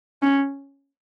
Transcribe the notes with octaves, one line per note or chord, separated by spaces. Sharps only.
C#4